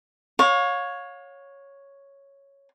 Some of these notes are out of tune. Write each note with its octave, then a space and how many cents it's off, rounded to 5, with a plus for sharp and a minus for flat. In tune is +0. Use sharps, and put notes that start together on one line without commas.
C#5 +0 F5 +35